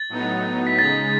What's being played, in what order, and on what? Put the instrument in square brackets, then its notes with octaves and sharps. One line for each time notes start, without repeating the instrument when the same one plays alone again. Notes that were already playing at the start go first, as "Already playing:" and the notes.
Already playing: [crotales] A6
[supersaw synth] A2 F#3 B3 D#4
[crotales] B6
[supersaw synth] C#3 G#3 D#4 [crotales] A6